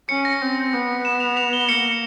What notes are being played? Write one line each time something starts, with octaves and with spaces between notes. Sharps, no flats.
C#4 C#7
A#6
C4
B3
E7
F7
F7
G7
A#3 C#7